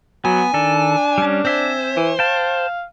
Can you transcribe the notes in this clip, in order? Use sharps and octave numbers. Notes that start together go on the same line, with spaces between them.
F#3 B3 G#5
D#3 D4 A4
G3 C#4
C4 C5 E5 G#5
E3
F5 G5 A5